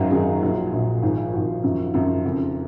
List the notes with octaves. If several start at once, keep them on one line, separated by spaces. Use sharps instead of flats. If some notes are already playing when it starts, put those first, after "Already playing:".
Already playing: G#1 F#2 D#3 F#3
G#1 F#2 D#3 F#3 G#4
A#1 A#2 F#3
A#1 A#2 F#3
G#1 G#2 F3
G#1 G#2 F3 F#4
G#1 F#2 C#3 F3
G#1 F#2 C#3 F3 F4
F#1 F2 C#3